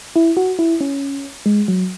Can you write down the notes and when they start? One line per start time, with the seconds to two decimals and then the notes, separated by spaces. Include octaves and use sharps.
0.16 E4
0.37 F#4
0.59 E4
0.81 C#4
1.46 G#3
1.68 F#3